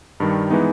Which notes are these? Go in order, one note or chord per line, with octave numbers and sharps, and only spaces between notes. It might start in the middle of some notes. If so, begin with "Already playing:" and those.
G2 D#3 G3
E3 G#3 B3 D#4